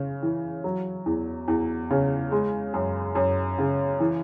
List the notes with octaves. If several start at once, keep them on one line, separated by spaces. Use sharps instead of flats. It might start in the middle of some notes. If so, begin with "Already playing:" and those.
Already playing: C#3
E3
F#3
E2
E2
C#3
G#3
F#2
F#2
C#3
E3